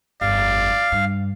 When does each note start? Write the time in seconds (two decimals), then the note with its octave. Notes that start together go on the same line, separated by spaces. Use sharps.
0.21 G1 F2 D5 F5
0.92 G2